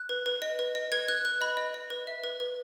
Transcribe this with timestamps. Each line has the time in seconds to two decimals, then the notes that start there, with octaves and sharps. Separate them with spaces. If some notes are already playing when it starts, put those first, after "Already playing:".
Already playing: F#6
0.09 B4
0.26 B4
0.42 D#5
0.59 B4
0.75 D#5
0.92 B4 G#6
1.08 B4 F#6
1.25 B4 F#6
1.41 D#5 B5
1.57 D#5
1.74 D#5
1.90 B4
2.07 E5
2.24 B4
2.40 B4